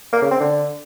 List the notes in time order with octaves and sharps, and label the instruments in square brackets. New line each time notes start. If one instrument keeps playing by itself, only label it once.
[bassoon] A#3
C#3
C4
D3